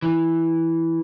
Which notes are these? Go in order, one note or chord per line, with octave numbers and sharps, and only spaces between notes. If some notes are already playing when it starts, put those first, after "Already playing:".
E3